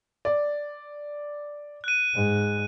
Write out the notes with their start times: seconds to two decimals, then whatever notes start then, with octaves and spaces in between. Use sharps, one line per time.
0.25 D5
1.84 F#6 D#7
2.15 G#2 G#3